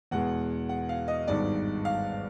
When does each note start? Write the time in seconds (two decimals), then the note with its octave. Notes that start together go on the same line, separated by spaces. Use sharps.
0.11 E2 B2 G#3 B3 F#5
0.69 F#5
0.89 F5
1.08 D#5
1.27 G#1 G2 D#3 G#3 B3 D5
1.85 F5